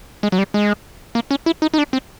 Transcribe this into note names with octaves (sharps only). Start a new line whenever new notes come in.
G#3
F#3
G3
G#3
A#3
C#4
E4
D#4
D#4
D4
C4